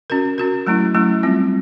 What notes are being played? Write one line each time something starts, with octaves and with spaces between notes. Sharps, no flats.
C#4 F#4 A#4
C#4 F#4 A#4
F#3 A3 C#4 E4
F#3 A3 C#4 E4
G3 C4 F4